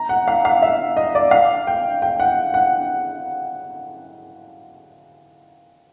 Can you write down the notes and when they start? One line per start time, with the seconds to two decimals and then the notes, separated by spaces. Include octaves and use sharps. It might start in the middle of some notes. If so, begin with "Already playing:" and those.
Already playing: A#5
0.09 F#5
0.28 F5
0.45 F5
0.62 E5
0.97 D#5
1.15 D5
1.31 F5
1.67 G5
2.02 G5
2.20 F#5
2.54 F#5